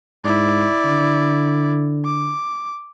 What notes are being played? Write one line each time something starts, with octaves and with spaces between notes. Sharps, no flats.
G#2 E4 D5
D3
D6